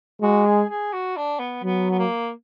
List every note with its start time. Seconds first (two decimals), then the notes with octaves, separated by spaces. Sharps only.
0.22 G#3 F#4
0.46 G#4
0.69 G#4
0.93 F#4
1.17 D4
1.39 B3
1.64 F#3 B3
1.91 B3
1.98 A#3